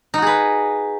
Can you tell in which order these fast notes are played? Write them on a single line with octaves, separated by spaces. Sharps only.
D#4 F#4 G#4 B4